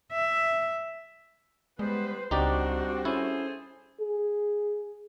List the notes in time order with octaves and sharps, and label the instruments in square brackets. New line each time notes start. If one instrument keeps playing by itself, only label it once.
[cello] E5
[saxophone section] G3 B3 [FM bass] G#3 [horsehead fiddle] B4 C5
[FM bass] C#2 [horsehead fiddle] G3 F#4 [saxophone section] C4 D4 [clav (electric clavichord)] D#4 G4 D5
[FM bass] C#4 [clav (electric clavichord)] E4 [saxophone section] G#4 A4 C5
[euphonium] G#4